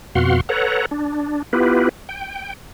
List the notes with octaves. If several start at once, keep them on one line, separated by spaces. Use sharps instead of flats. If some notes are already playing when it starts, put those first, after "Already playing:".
F2 B2 F#4 F5 F#5 C6
A4 B4 C#5 F#5 A#5
D4
B3 E4 F4 G4 B4
G5